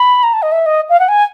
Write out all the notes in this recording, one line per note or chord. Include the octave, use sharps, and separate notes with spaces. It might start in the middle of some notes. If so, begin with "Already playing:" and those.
Already playing: B5
A#5
A5
D#5
E5
D#5
F5
F#5
G#5